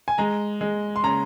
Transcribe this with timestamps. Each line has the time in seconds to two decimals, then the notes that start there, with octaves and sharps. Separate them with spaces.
0.08 G#5
0.18 G#3 A#5
0.61 G#3
0.96 C6
1.03 C#3 A#5